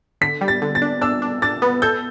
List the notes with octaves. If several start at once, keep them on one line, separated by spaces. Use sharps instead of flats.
D3 B6
G3
A6
D3
A6
D4
D4 E6
D4
D4 A6
B3
A4 G6